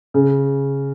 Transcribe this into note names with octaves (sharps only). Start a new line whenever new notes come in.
C#3